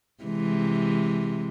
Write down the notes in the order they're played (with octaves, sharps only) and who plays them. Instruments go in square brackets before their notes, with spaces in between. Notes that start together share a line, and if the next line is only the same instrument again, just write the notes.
[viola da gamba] C3 E3 G#3